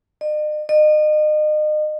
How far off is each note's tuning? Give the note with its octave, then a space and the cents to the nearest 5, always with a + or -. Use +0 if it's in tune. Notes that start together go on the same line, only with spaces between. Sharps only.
D#5 -45
D#5 -35